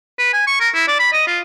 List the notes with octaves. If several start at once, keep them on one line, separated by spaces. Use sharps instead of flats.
B4
G#5
C#6
A#4
E4
D5
B5
D#5
F4